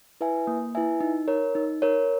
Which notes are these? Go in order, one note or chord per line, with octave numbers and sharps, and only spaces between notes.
E4 B4 E5 G#5
A#3
E4 B4 E5 G#5
D#4
A#4 C#5
D#4
A#4 C#5